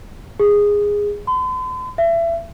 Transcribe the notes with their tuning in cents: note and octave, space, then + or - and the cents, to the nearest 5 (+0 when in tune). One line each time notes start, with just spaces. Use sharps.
G#4 -15
C6 -45
E5 +30